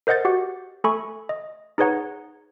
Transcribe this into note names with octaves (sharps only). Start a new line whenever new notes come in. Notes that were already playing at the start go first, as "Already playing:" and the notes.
A#4 C5 D#5 F#5 G6 A6
F#4 G4 F#5
A3 A4 G#5 B5 C#6
D#5
D#4 G#4 B4 C#5 F#5 A#5